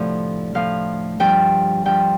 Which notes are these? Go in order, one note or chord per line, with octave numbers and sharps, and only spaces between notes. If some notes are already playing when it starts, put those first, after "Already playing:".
Already playing: D2 A2 C3 F3 D5
A2 F3 F5
G2 F3 G5
G2 F3 G5